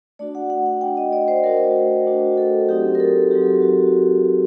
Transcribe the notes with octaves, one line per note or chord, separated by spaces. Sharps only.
A3 D4 F#4 D5
F#5
F#5
F#5
A3 D4 F#4 G5
D#5
D5
C5
A3 D4 F#4 A#4
A3 D4 F#4
A4
F#3 C4 D#4 F#4 G4
A#4
A4
F#3 C4 D#4 F#4 G4
F#4